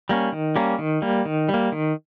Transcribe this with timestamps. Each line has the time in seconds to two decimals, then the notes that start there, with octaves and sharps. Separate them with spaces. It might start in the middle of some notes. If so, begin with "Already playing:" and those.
0.09 G3 A#3 C#4
0.32 D#3
0.56 G3 A#3 C#4
0.79 D#3
1.02 G3 A#3
1.25 D#3
1.49 G3
1.54 A#3
1.72 D#3